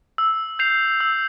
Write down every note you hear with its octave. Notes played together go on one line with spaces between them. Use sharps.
E6
G6 C7 F7
E6